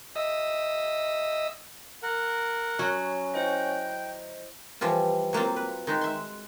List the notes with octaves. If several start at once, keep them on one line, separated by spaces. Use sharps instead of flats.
D#5 E5
A#4 F#5
F#3 C#4
E4 C5 D#5 G5
E3 F3 G3 F4
F#3 A#3 C4 F4
B4
D#3 G#3 D#4 F#4
E5 C6